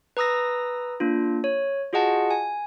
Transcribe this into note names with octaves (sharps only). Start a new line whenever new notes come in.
B4 A#5 D#6 E6 A#6
A#3 D4 F4
C#5
F4 F#4 G#4 D#5 F#5 A5
G#5